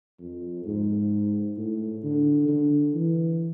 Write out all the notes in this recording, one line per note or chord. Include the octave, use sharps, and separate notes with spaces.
F2
G#2
A2
D3
D3
E3